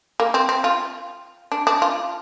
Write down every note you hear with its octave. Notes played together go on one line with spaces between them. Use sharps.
A#3
C4
C4
F4
D4
D4
F4